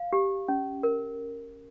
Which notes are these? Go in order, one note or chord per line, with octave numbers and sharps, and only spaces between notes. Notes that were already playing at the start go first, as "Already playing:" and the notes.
Already playing: F5
G4
C#4
A#4